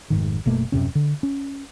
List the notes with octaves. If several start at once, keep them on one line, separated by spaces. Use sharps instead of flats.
F1 G#2 D#3
F#1 B2 A3 A#3
D#1 F#2 C3 C#4
D3
C#4